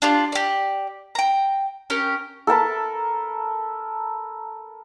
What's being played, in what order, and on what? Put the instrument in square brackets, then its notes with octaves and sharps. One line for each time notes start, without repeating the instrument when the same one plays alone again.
[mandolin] D4 F4 G4
G4 D5
G5 A#5
C#4 G4 A#4
[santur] A4 A#4 A5 B5